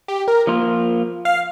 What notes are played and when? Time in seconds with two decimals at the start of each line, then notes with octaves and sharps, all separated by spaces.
0.08 G4
0.28 A#4
0.47 F3 A#3 F4
1.25 F5